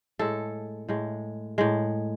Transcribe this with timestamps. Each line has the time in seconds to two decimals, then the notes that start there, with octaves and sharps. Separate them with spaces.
0.19 A2 G#3 A4
0.89 A2 G#3
1.58 A2 G#3